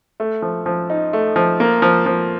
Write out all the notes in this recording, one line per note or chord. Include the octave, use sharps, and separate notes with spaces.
A3
F3
F3
D#4
A3
F3
A#3
F3
F3